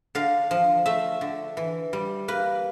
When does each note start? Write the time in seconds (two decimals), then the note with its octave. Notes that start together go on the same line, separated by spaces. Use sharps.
0.15 D3 F5
0.51 F3
0.86 A3 E5
1.21 D3
1.57 E3
1.93 G3
2.28 A#3 B4